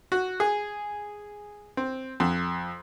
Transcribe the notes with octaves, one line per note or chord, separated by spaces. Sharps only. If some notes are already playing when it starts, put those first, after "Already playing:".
F#4
G#4
C4
F2